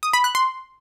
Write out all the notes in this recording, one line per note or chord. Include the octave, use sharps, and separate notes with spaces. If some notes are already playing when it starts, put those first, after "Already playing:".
D#6
B5
F#6
C6